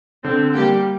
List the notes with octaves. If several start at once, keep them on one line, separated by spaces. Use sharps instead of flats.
D3 C4
G3 A#3 G4